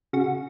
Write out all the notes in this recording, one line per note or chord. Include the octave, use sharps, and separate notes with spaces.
C#3 F#4